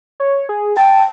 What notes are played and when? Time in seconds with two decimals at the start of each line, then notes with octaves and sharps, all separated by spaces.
0.20 C#5
0.49 G#4
0.77 G5 A5